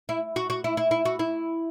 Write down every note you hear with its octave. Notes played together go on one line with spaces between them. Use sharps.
E4
F#4
F#4
E4
E4
E4
F#4
E4